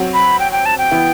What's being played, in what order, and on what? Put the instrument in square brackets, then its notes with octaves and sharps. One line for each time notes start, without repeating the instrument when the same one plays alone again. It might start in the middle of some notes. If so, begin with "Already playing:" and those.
Already playing: [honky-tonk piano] F#3 C4 F#4
[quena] B5
G5
G5
A5
G5
[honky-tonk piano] E3 B3 E4